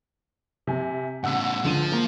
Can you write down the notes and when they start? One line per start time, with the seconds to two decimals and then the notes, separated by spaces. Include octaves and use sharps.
0.67 C3 G#5
1.24 A2 C#3 F#5 E6 B6
1.64 C#2 D3 F3 D#7
1.92 A#3